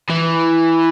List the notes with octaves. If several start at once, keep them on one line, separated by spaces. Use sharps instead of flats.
E3